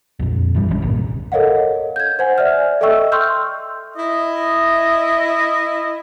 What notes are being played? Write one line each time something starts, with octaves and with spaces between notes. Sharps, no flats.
A#1 F2
G2 E3 F3 G3
A#1 D3 C#4
G1 C2 A#2
A4 A#4 C#5 D#5 F5 F#5
G6 G#6
C5 F#5 G#5
D5 E5 F6
A4 D#5 E5 G5 C#6 E6
G5 C6 C#6 E6 F6 G6
E4 D#5